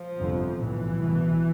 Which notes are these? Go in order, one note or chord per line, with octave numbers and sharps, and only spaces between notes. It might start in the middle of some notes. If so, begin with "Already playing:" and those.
Already playing: F3
G1 F2 C3
B1 A2 E3
C2 B2